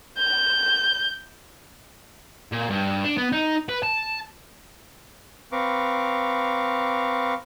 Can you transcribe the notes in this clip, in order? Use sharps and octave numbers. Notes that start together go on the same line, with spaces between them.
G6
A#2
G2
D4
B3
D#4
B4
A5
C4 B4 F5 A#5 C#6 D6